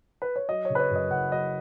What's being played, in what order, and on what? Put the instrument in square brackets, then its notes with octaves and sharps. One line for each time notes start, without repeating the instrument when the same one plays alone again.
[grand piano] B4
C#5
F#3 D#5
C#3 C#5
B4
C#5
F#2 D#5
F#1 F#5
F#3 D#5